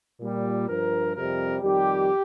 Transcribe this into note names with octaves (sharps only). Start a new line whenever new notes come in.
A#2 G3
G2 F3 A#4
F2 C3 G3 A#4
F2 D#3 G3 G4